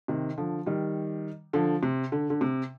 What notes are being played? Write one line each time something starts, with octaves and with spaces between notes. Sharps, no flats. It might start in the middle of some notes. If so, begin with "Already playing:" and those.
C3 D#3
D3 F3
D#3 G3
D3 F3
C3
D3
D3
C3